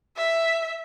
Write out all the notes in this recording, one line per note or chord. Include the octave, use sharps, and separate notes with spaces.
E5